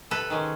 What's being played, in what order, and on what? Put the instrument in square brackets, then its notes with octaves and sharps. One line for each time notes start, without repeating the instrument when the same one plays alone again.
[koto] C3 A4 B4
D#3 G#3 C#4